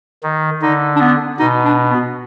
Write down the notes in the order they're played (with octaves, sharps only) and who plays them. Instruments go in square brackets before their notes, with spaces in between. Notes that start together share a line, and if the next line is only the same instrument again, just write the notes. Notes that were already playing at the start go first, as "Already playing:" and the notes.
[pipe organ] D#3
[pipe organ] D3 [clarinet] D#4
[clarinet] D4
B3
[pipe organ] B2 [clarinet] D#4
[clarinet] D4
B3